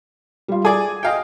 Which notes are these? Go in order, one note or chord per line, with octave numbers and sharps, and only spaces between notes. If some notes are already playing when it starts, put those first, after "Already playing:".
G3 F4
G#4 D5 G#5
D#5 F5 G5